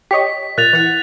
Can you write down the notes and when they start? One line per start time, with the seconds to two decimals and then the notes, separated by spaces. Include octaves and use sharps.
0.11 G4 C#5 D#5 B6
0.58 A#2 F#6 A6 F7
0.73 E3 F#5